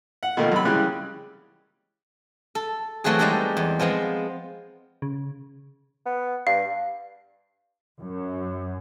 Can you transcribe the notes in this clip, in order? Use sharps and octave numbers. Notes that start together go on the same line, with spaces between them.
F#5
B2 D#3 F3 A3 A#3
F#2 C3 B5
C#3 E3 G3 G#3 G4 F#6
A4
E3 F#3 A3 C4 F#4 G#4
G3 G#3 D#4 G4 A4
E2
F3 G#3 B3 C4
C#3
B3
G2 F5
F#2